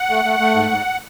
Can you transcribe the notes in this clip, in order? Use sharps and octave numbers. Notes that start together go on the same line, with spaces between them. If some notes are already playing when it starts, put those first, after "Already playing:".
Already playing: F#5
A3
A3
A3
G#2
G#2